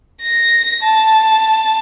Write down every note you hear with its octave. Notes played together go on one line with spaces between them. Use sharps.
A#6
A5